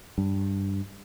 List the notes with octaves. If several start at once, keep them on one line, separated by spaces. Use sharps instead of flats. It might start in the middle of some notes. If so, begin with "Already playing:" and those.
G2